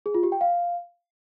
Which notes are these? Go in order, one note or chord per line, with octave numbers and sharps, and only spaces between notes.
G#4
F4
G4
G5
F5